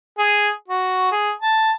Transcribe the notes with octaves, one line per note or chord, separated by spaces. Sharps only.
G#4
F#4
G#4
A5